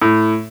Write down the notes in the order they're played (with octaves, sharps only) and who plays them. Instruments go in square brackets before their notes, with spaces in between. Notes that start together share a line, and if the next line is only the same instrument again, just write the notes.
[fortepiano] A2